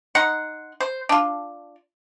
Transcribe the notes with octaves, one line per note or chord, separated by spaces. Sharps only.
D#4 F#5 C6
C5
D4 F4